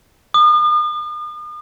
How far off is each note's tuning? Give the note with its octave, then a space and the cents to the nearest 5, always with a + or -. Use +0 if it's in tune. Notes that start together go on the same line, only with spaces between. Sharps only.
D#6 -40